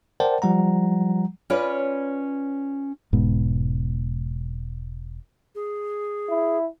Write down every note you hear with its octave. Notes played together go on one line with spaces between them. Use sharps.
A#4 C5 D5 F#5 G5 A5
F3 G3 F#5 A#5
C#4 F4 B4 C#5 D5
E1 G#2 B2
G#4
E4